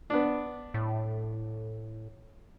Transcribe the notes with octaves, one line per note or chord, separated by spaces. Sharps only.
B3 D4
A2